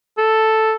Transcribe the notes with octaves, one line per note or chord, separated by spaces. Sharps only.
A4